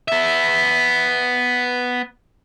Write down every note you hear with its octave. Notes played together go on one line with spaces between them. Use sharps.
B3 E5